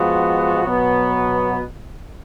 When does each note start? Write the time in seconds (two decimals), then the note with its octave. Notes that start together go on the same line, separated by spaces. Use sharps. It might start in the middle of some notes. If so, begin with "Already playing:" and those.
Already playing: F3 G#3 B3 F#4
0.64 B2 F#3 B3